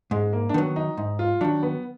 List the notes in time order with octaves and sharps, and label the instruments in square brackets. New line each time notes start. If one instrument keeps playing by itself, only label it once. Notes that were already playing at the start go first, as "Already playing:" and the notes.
[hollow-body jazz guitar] G#2 [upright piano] G#3
[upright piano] A#3
D4
[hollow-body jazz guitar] D#3 F#3 [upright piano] B3
[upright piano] D#4
[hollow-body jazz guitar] G#2 [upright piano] D#4
[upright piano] F4
[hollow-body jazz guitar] D#3 F#3 [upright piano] D4
[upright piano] B3